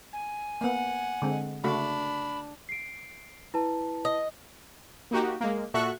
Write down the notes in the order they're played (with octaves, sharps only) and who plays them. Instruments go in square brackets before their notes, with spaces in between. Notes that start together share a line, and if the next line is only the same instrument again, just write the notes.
[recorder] G#5
[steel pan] A#3 B3 [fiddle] F#5
[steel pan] D3 G#3 C4
[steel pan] C#3 A3 F#4 [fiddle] D4 [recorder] B5
[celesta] C7 D7
E4 B4 A5
[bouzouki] D#5
[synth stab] A#3 D#4 F#4 G4
G#3 A#3
A#2 F#4 A4 E5 C#6 F#6